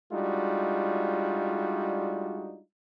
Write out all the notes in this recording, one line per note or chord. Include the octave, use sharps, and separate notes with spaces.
G3 G#3 D4 D#4 F4 F#4